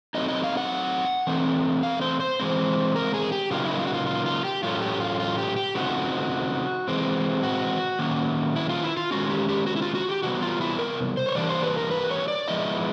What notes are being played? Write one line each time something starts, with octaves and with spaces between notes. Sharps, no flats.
F#3 A3 C4 D#4 D#5
D#5
F5
F#5
E3 A3 C4
F5
C5
C5
E3 G#3 C4
A#4
G#4
G4
C#3 F#3 A#3 D#4 F4
E4
F4
F#4
F4
F4
F4
G4
A2 F#3 A3 C#4 F4
G4
F4
F4
G4
G4
C#3 F3 A3 C4 D#4 F#4
C3 E3 G#3 C4
F#4
D#3 F#3 A#3 C#4
E4
F4
E4
F4
D#3 G#3 C#4 F#4
G4
G4
F#4
E4
F4
F#4
G4
C3 E3 G3 B3 F#4
F4
E4
A#4
C5
C#5
E3 G3 A#3 D4 D5
C5
B4
A#4
B4
C#5
D5
F3 G#3 B3 E4 D#5